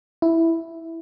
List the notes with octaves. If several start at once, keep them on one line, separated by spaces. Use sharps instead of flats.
E4